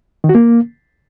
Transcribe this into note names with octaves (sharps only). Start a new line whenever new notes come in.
D#3
F#4
A#3